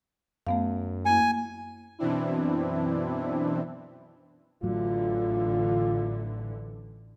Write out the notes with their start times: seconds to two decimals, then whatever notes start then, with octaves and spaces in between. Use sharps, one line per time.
0.47 F#2 A3 B3 F5
1.06 A#3 E4 G#5
1.99 F#2 B2 E3 C4 D4 E4
4.63 A1 A2 D3 E3 F#3 F4